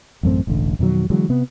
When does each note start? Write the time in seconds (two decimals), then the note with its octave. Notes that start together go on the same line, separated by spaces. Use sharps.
0.23 A1 F#2 A3 C4
0.47 E1 A1 D3
0.79 F2 B2 D#3 F#3
1.10 D3 E3 F#3 G#3
1.29 C3 B3